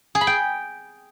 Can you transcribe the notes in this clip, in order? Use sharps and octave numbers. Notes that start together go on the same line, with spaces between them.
G#4
B5
G5